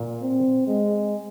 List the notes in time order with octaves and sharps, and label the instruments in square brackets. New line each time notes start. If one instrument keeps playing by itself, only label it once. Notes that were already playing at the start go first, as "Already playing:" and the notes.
Already playing: [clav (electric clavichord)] A#2
[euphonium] C4
G#3